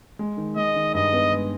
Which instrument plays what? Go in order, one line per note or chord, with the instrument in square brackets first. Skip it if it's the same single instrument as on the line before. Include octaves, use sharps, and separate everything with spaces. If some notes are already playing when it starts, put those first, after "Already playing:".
[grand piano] G#3
D#3
[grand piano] G#3 [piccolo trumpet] D#5
[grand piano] D#3
[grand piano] G2 [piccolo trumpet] D#5
[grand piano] B3
G#3